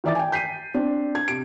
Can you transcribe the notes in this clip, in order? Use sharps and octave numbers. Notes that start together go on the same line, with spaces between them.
D#3 E3 D5 E5 D6 A6
G5 G#5
G6 B6 C7 D#7
C4 D4
G#6
C3 D7